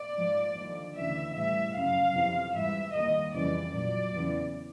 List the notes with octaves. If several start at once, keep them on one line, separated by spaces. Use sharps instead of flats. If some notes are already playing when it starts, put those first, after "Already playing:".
Already playing: D5
G#2 F3
D#2 D3 F3
D2 C#3 E3 E5
A2 E3 G3 E5
F#2 C#3 F#3 F5
F2 C3 E3
G#2 E3 G3 E5
D#2 D#3 G3 D#5
F2 C#3 E3 G3 D5
A#2 F#3 D5
E2 C#3 E3